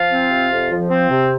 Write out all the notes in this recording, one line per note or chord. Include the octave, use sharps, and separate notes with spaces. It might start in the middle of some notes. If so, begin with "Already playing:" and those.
Already playing: F3 F4 F5
C4
C3
F2
F3
C4
C3